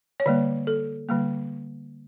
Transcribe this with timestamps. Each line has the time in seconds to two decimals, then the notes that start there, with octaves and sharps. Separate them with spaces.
0.20 C#5
0.26 D3 G3 A#3 D5
0.67 A4
1.09 D3 G3 A#3